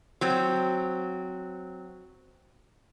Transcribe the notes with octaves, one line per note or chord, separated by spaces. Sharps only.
F#3 C4